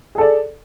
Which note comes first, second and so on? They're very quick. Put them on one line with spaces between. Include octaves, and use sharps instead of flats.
G#4 A4 D5